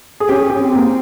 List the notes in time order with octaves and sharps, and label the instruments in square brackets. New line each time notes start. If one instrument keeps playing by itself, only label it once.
[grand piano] G#4
[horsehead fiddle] C#4 [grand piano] G4
[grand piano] G#4
G4
[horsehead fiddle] C4
[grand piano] A#3